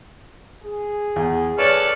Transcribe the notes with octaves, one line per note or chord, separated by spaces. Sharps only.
G#4
E2
A4 B4 C#5 D5 F6